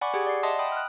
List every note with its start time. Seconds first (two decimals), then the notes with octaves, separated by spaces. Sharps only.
0.01 D5 F#5 G#5 B5 C#6 D6
0.14 G4 G#4 F#5 G#6
0.26 D5 C7
0.43 D#5 E5 F#5 A5 C6 D#6
0.59 G5 B5 D#6
0.72 F6 F#6